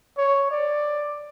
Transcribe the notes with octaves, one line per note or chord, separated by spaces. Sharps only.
C#5
D5